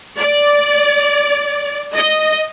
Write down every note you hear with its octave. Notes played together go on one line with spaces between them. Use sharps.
D5
D#5